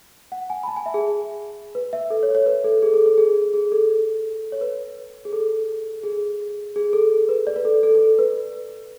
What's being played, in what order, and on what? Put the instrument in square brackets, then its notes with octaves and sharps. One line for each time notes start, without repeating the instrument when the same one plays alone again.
[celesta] F#5
G#5
B5
A5
G#5
E5
G#4
B4
E5
A4
C#5
C#5
B4
A4
G#4
A4
A4
G#4
G#4
A4
C#5
B4
G#4
A4
G#4
G#4
A4
B4
D5
B4
A4
A4
A4
B4